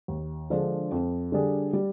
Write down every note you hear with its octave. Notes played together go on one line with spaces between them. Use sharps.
D#2
D3 F3 G#3 D4
F2
D3 G3 D4 G#4
G3